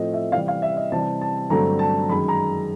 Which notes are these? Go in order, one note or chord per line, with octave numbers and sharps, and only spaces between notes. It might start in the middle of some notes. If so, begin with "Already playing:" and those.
Already playing: A2 F3 A3 C4 F4 D#5
E5
C3 E3 G3 F5
F5
E5
D#5
C3 E3 G3 A5
A5
G2 D3 F#3 A3 C4 A#5
A5
F#2 D#3 G#3 B5
A#5